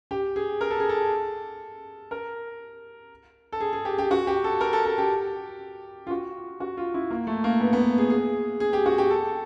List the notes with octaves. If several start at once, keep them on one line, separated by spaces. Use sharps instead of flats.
G4
G#4
A#4
A4
G#4
A4
A#4
A4
G#4
G#4
G4
G4
F#4
G4
A4
A#4
A4
A4
G4
F4
F#4
F#4
F4
E4
A#3
A3
A#3
B3
B3
G#4
G#4
G#4
G4
F#4
G4
A4